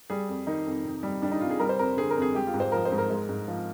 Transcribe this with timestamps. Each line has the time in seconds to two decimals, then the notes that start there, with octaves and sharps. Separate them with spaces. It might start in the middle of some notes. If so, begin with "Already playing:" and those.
0.10 G3 G#4
0.29 F2
0.47 D#3 D#4
0.66 F2
0.85 C3
1.03 G3
1.22 G3 D4
1.31 D#4
1.41 C3 F4
1.50 G#4
1.59 G3 A#4
1.69 C5
1.79 F2 A#4
1.97 D3 G#4
2.10 A#4
2.17 F2
2.22 G#4
2.34 G#3 G4
2.47 F4
2.54 G#2
2.60 C5
2.72 F3 A#4
2.85 C5
2.92 G#2
2.98 A#4
3.10 G#3
3.29 G#2
3.48 F3